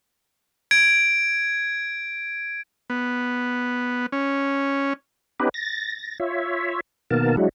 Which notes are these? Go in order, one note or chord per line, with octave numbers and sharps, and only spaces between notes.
G#6 D7
B3
C#4
B3 C#4 D#4 G4 B4
A6 A#6
F4 C#5 E5
B2 D#3 A#3 B3 A#4 A5
F#3 G#3 D4 E4 F#4